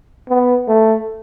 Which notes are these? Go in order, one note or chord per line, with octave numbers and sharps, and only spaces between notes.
B3
A3